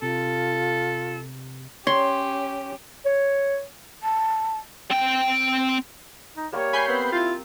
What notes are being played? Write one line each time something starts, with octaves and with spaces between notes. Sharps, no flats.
C3 F4 A4
C#4 G4 C#5 C6
C#5
A5
C4 G5
D#4
G3 A#3 C#5 C#6
G5 G#5 B5 G6 C7
B3 C4
E4 F4